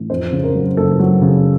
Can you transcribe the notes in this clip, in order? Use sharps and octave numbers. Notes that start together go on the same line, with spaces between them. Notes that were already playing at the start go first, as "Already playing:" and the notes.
Already playing: A1
F2 C5
C#3
A#4
F#3
F#1 A4
F#3
C#3